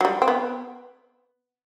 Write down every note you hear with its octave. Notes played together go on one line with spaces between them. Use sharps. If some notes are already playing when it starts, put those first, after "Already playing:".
F#3
G3
C4
B3